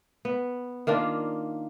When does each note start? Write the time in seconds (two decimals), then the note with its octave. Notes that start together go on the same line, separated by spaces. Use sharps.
0.25 B3
0.87 D#3 A#3 D4 F4